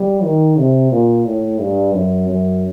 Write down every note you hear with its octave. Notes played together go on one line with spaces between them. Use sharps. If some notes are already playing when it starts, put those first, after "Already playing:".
Already playing: G3
D#3
C3
A#2
A2
G2
F#2
F#2